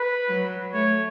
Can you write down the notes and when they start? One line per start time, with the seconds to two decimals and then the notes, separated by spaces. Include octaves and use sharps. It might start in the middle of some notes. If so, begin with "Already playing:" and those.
Already playing: B4
0.28 F#3
0.73 A3 C#5